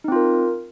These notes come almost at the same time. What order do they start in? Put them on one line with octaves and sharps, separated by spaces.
D#4 C4 F4 A#4